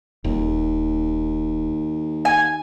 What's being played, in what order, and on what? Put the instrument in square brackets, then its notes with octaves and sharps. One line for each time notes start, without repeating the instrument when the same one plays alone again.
[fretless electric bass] D#1 [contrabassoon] D#2
[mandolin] G#5